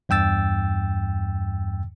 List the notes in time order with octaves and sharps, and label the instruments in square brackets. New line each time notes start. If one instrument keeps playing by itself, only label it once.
[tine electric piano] E2 G2 G5 E6 A6